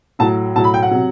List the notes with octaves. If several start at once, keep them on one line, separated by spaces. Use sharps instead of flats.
A2 F#3 A5
A2 F#3 A5
B5
G5
F#5
C3 F#3